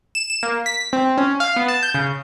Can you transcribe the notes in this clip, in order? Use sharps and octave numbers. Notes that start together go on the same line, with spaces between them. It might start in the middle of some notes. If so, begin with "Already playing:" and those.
E7
E7
A#3
B6
C4
C#4
F5
B3
A5
G6
C#3